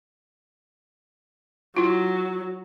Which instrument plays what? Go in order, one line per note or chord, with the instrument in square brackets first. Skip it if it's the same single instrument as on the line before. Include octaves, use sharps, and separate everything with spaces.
[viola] F#3 [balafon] E4 F4